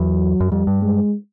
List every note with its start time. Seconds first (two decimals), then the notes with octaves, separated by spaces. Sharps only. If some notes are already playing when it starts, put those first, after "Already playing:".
Already playing: E2 F#3
0.40 F#2
0.52 F2 G3
0.67 G2
0.82 G#3